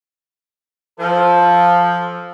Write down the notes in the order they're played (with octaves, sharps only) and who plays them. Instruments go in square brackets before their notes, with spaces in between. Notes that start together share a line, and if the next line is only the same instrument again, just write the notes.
[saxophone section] F3 [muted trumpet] A4